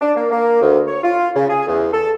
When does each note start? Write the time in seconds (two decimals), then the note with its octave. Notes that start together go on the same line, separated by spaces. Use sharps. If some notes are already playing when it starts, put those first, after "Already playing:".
0.01 D4
0.16 A#3
0.31 A#3
0.61 D2
0.87 C#5
1.03 F4
1.35 C#3
1.49 G#4
1.67 E2
1.93 A4